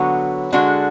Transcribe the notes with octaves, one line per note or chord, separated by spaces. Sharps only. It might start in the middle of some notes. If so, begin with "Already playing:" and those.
Already playing: D3 F#3 B3 F#4 C#5
D3 G#3 D4 F#4